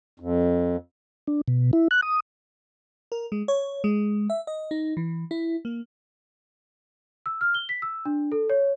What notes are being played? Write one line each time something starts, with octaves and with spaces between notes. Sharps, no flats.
F2
D4
B2
E4
F#6
D#6
A#4
G#3
C#5
G#3
E5
D#5
D#4
E3
E4
A#3
E6
F6
G7
B6
E6
D4
A4
C#5